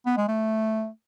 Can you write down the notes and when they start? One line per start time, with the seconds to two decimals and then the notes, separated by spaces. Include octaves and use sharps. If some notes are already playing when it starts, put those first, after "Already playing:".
0.06 B3
0.17 G#3
0.28 A3